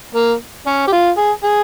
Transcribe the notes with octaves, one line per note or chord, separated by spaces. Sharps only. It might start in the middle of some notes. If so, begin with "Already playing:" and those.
A#3
C#4
G4
F4
G#4
G#4